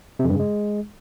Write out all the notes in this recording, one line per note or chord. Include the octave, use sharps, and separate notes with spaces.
C3
F2
G2
C#3
G#3